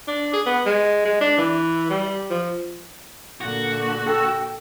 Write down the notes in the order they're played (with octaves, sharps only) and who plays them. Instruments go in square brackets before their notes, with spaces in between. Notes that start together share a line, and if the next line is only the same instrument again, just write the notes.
[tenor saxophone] D4
G#4
B3
G#3
G#3
D4
E3
G3
F3
[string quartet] A#2 D3 [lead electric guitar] F#4
[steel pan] A4 [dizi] G5